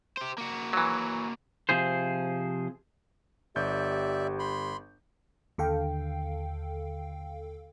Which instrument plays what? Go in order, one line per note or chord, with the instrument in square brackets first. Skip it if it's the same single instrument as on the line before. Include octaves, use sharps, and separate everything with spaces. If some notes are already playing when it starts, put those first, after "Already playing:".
[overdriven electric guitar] G4 C5
A#3 F#4
[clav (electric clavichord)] E3 F#3
[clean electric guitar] C3 F3 G#4 C5
[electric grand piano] G1 G6 [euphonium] G4 [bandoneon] D5 E5
[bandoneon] B5 C6
[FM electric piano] D#2 D3 A4 F5 G5